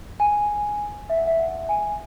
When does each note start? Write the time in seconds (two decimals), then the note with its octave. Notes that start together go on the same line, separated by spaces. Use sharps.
0.20 G#5
1.10 E5
1.17 F#5
1.27 E5
1.39 F#5
1.69 G#5